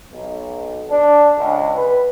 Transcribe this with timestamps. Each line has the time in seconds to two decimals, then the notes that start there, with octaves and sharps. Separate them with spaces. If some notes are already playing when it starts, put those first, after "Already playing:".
0.13 B1
0.91 D4
1.39 C#2
1.76 B4